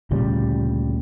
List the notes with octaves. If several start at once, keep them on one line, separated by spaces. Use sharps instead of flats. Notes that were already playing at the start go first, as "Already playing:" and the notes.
D2 A#2 C#3 G3